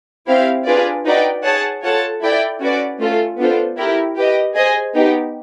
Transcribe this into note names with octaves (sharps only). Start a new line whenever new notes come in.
C4 E4 G4 C5 F5
D4 F4 G#4 B4 D5
D#4 F#4 B4 D5 G5
G#4 C#5 F#5 A5
F4 A4 C#5 F#5 A5
E4 A4 D5 G5
C#4 F#4 B4 D5
A3 C#4 F4 A4
B3 D4 F4 A4 C5
E4 G4 A#4
G4 B4 D#5
G#4 C5 D#5 G#5
B3 D#4 G4